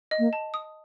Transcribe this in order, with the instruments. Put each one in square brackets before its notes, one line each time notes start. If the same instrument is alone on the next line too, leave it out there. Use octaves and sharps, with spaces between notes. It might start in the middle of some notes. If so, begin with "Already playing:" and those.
[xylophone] D#5
[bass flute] A#3
[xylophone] A5
D#6